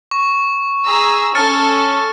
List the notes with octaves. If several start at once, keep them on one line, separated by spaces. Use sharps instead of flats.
C#6
G#4 A#5 E6
C#4 A4 F6 A6 C#7